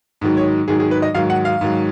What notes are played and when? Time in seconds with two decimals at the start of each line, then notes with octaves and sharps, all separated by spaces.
0.21 G#2 D#3 F#3
0.37 C#5
0.68 G#2 D#3 F#3 G#4
0.80 G#4
0.91 B4
1.02 D#5
1.14 G#2 D#3 F#3 F5
1.30 F#5
1.45 F5
1.61 G#2 D#3 F#3